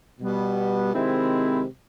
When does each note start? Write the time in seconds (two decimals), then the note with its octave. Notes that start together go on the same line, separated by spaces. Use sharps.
0.20 B2 G3 B3
0.93 C3 D#3 G#3 C4 E4